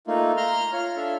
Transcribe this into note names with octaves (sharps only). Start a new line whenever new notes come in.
A3 A#3 D#4 F4
A#5 C6 F6
F4 C#5 F6
D4 F4 A4 E5